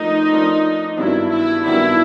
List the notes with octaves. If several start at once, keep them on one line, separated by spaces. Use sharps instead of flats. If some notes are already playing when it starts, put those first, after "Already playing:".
Already playing: F3 A3 D4 D#4 F4 A#4
F3 A3 D4 F4 A#4
G2 D#3 F#3 B3 D4 E4
E4
G2 D#3 F#3 B3 D4 E4